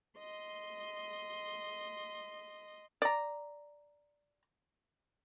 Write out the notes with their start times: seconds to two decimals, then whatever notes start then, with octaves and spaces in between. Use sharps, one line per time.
0.19 D#5 C6
3.02 D5 A#5